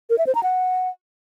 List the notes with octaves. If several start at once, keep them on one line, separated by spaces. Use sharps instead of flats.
A#4
E5
C5
A#5
F#5